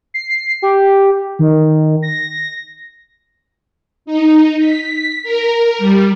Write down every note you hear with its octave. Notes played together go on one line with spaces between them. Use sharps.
C7
G4
D#3
A#6
D#4
B6
A#4
G3